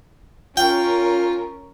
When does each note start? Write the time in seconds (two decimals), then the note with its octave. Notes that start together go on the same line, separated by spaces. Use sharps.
0.57 C#4 F4 A#4 G5